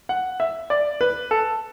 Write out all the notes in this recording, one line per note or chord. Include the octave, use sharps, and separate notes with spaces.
F#5
E5
D5
B4
A4